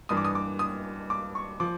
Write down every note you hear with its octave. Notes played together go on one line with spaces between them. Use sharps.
G2 E3 D#6
D6
D#6
D6
D#6
D6
C#6
F3 D6